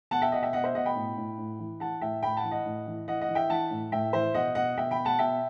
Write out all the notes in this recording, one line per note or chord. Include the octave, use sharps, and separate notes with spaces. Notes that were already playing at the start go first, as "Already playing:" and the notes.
B2 F#5 A5
E5 G5
B2 D#5 F#5
E5 G5
B2 D#5 F#5
C5 E5
B2 D#5 F#5
G5 B5
A2
A2
A2
E3
E3 F#5 A5
A2 E5 G5
A2 G5 B5
F#5 A5
E3
D#5 F#5
A2
E3
E3 D#5 F#5
D#5 F#5
E3
E5 G5
E3 F#5 A5
A2
A2 E5 G5
E3 C5 E5
B2 D#5 F#5
B2 D#5 F#5
B2 E5 G5
G5 B5
B2
F#5 A5
B2 E5 G5